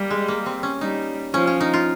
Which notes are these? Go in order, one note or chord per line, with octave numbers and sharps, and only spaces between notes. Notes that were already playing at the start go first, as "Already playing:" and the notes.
Already playing: G3 A#3
G#3
A#3
C4
C#4
G3 D#4
F3 C#4
C#4
D#4
F4